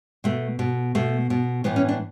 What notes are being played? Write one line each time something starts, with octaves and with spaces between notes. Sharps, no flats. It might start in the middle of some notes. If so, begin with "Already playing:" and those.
B2 A3
B2
B2 A3
B2
A2 E3 B3
C#4
D4